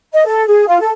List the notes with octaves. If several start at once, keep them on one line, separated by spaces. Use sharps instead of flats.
D#5
A4
G#4
F4
A4